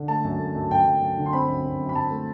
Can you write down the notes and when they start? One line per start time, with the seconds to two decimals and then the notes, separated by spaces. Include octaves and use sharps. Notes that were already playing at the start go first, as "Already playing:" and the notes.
Already playing: D3
0.08 A3 A5
0.24 F#2
0.40 A3
0.55 F#2
0.71 F#2 G5
0.86 F#2
1.01 F#2
1.17 D3
1.26 C6
1.33 C4 B5
1.49 F#2
1.65 F#2
1.80 F#2
1.89 B5
1.95 F#2 A5
2.10 A3